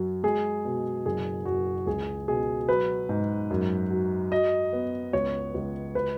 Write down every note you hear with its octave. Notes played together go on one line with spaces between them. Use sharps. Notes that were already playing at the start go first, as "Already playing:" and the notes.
Already playing: F#2 F#3
G#3 G#4
B2
F#1 G#4
F#2 F#4
C#2 G#4
B2 G#4
F#3 B4
G#2
F#2
F#3
F#3 D#5
B3
C#2 C#5
C#2
B4